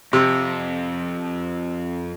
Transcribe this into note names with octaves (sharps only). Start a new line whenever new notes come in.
F2 C3